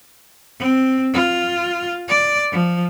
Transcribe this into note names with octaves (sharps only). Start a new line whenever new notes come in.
C4
F4
D5
F3